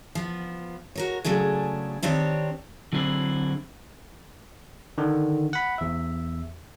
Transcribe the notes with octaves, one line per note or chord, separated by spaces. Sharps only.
F3 B3
F#4 A#4 C#5
C#3 F#3 A3 D4 G#4
D#3 C4 D4 G4 C#5
D3 F#3 C4 D4 E4 G#4
D3 D#3
F#5 B5
E2 E5